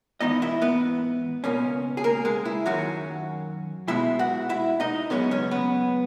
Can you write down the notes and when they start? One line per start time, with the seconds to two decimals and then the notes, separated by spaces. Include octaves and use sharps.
0.21 G#2 E3 B3 D#4 D#5
0.42 E4 E5
0.62 B3 B4
1.44 C#2 B2 A#3 C#4
1.97 G#4
2.04 A#3 A#4
2.25 G#3 G#4
2.45 E4
2.66 F#2 D#3 F#3 A#3 C#4 F#4
3.88 B2 G#3 B3 E4 E5
4.19 F#4 F#5
4.49 E4 E5
4.80 D#4 D#5
5.10 F#2 C#3 G#3 B3 C#4 C#5
5.31 C#4 C#5
5.51 B3 B4